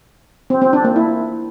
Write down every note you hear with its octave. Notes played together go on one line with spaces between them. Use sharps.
C4
C4
D4
A#3
E4